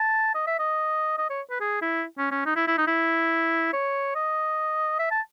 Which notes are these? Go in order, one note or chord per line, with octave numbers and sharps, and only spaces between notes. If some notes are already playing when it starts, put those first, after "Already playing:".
Already playing: A5
D#5
E5
D#5
D#5
C#5
B4
G#4
E4
C#4
C#4
D#4
E4
E4
D#4
E4
C#5
D#5
E5
A5